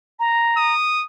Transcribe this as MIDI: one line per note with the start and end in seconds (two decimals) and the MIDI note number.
0.19 0.74 82
0.58 1.06 87